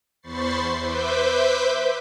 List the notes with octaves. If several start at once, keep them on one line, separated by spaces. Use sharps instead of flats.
E2 C5 B5 C#6 A6 C7
B4 C5 E5 D6 G6 B6